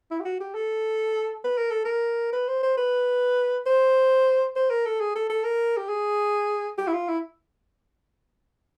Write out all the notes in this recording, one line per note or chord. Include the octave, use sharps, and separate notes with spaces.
E4
G4
F#4
G4
A4
B4
A#4
A4
A#4
B4
C5
C5
B4
C5
C5
A#4
A4
G#4
A4
A4
A#4
G4
G#4
G4
E4
F4
E4